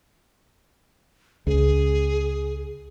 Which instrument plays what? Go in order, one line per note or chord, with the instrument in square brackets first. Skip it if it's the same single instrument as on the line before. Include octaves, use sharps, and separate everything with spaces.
[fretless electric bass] C#2 [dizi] G#4